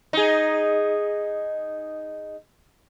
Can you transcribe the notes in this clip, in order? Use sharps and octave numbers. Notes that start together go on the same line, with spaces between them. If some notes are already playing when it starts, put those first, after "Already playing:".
D#4 G#4